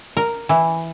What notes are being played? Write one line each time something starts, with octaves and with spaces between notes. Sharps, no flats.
A#4
E3